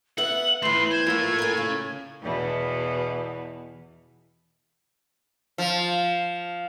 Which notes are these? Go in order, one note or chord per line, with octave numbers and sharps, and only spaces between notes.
B3 E5 F#5 F#7
E3 A3 B3 B5 C6
C5 G#6
F3 A#3 E4 A4
A#4 G#5
C#3
E2 B2 E3
F3